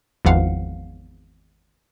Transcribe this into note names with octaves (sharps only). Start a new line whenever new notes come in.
G#1 E2 F3 F5 F#5